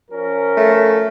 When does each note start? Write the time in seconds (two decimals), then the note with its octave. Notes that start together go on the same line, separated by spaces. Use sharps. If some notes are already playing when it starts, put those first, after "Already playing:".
0.11 F3 C#4 A#4
0.57 A3